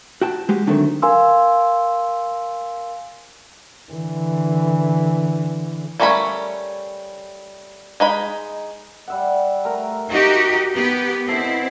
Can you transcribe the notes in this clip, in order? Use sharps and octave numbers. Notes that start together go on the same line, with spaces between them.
F#4 G5 A5
G#3 F#4 G4
D3 D#3 F#3 A3 C4
A#4 F5 G#5 C6 E6
D3 E3
G3 A3 C#4 A#4 B5
G#3 D#4 B5
G3 E5 F#5
A3 A#4 A#5
D#4 F#4 G4 G#5
B3 G4
B2 C4 E4 A4